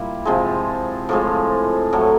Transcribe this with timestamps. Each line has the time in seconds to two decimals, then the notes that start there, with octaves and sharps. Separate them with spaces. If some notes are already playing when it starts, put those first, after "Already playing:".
Already playing: A#2 G3 E4
0.25 C3 F3 G#3
1.09 A2 F3 G#3
1.93 A2 F#3 A3